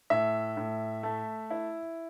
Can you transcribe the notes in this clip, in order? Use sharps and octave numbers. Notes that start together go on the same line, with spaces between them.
A2 E5
A2
A3
E4